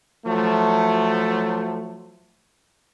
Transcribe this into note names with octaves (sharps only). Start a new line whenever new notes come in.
F3 F#3 A3